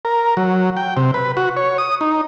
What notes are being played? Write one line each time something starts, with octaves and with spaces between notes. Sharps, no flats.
A#4
F#3
G5
C3
B4
F#4
C#5
D#6
D#4